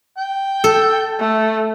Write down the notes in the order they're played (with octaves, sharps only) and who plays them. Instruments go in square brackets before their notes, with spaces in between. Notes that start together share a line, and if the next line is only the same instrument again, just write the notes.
[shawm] G5
[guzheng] A4
[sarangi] A3